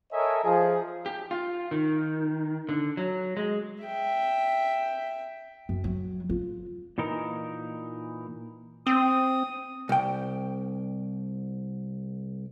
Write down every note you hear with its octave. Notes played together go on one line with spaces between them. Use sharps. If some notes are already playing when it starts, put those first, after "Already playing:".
A4 A#4 C#5 D#5 E5 G#5
F3 G#4
G4
F4
D#3
D3
F#3
G#3
E5 G5
F#2
F#3
F4
A#2 E3 D#4 A#4
C4 D#6
C2 G5